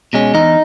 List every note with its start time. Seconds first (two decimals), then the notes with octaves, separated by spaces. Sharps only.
0.13 B2 G#3 C#4
0.34 E2 D#4